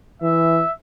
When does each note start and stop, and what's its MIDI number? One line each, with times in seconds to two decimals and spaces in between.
0.22 0.62 52
0.22 0.72 76